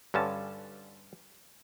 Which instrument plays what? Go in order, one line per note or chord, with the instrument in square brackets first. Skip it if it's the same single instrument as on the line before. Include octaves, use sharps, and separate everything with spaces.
[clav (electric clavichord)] G2 D3 C#4 A5